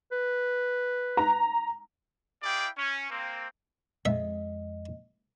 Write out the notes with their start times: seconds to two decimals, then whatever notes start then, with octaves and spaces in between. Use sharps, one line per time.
0.12 B4
1.17 A#5
2.43 E4 G#4 D5 F5 G5
2.77 C#4
3.10 A#3 C4
4.05 F2 G#3 D#5 E5